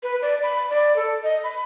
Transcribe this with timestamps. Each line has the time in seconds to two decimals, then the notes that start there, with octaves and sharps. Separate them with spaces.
0.03 B4
0.22 D5
0.43 B5
0.70 D5
0.96 A4
1.24 D#5
1.44 B5